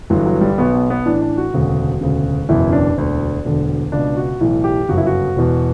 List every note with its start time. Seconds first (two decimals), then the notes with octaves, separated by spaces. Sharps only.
0.10 G1 G2 E3 F#3
0.26 F#3
0.41 G3
0.58 B1 B2 B3
0.74 B3
0.90 B3
1.06 A1 A2 E3 D4
1.22 D4
1.37 F#4
1.54 E1 D2 C#3
2.01 E1 D2 C#3
2.49 F#1 E2 B2 E4
2.69 C#4
2.73 D4
2.97 E1 D2 D3 D4
3.45 E1 D2 D3
3.92 C#2 B2 D4
4.17 F#4
4.41 B1 A2 E3
4.64 G4
4.89 G1 F#2 C#3 F#4
4.97 E4
5.06 F#4
5.36 E1 E2 B2